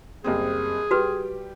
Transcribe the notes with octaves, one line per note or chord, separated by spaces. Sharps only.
F#1 G3 C4 G#4
G3 F#4 G4 B4